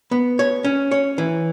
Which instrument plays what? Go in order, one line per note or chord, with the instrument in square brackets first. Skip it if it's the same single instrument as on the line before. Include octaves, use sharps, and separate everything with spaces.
[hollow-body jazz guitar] B3
C#5
C#4
C#5
E3